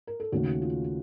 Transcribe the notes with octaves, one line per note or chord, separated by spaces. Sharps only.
A#4
A4
D#2 C#3 A3 F#4
F4